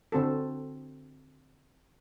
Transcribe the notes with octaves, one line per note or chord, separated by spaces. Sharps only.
D3 C4 F#4 A4